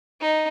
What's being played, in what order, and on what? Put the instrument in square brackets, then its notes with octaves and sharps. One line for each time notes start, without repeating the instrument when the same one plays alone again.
[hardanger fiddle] D#4